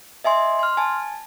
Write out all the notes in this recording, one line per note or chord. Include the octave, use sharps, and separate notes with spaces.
D#5 E5 G#5 C6
C6 F6
G#5 A5